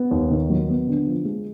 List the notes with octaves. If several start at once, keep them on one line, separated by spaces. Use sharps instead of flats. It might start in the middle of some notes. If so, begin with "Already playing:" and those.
Already playing: B3
D#2
D#3
F#3
B3
D3
F3
G#3